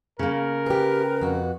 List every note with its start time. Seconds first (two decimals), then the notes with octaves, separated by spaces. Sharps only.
0.19 C#3 A#3 A#4
0.66 G4 G#4 B4
1.21 F2 F#4